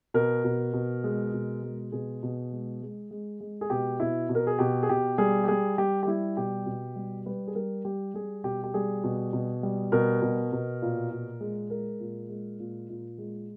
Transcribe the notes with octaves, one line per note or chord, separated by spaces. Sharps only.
B2 A#4
B2
B2
G#3
B2
G#3
B2 G#4
B2
G#3
G#3
G#3
G#3
G#4
B2 G4
B2 E4
B2
A#4
G#4
B2 G4
G#4
B2 G4
G3 G#4
G4
G3 G#4
G3 G4
G4
G3 E4
B2 G4
B2
G3
G3 B4
G#4
G3 A#4
G3 G4
G3 G#4
B2 G4
G4
G3 G#4
B2
B2
G3
B2 A#4
B2
B2
A#2
A#2
G#3
G#3 A#4
A#2
G#3
A#2
A#2
G#3